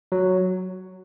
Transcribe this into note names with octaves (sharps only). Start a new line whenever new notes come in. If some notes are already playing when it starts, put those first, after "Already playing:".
F#3